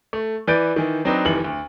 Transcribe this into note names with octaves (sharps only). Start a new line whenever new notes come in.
A3
E3 B4 D5 G6 A6 D7
D#3 E3
F#3 C4 D4 D#4 B4 D5
F1 D#3 E3 F#7
D2